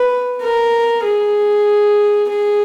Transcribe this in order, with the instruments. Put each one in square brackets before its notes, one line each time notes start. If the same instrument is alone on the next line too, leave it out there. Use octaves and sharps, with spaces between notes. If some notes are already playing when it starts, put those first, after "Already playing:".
Already playing: [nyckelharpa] B4
A#4
G#4
G#4